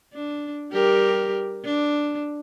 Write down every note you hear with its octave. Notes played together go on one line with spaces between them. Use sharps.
D4
G3 G4 A#4
D4